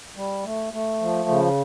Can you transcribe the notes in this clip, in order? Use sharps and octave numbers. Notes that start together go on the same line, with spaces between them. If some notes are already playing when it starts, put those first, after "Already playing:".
G3
A3
A3
F3
C#3